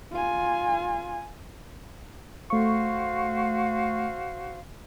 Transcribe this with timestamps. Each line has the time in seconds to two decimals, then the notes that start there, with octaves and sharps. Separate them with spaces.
0.12 F4 G#5
2.50 A3 F#4 C5 F5 C#6